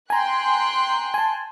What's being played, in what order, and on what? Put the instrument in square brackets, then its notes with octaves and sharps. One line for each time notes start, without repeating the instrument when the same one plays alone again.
[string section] G5 C6 F#6 [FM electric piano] G#5 A#5
[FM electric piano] G#5 A5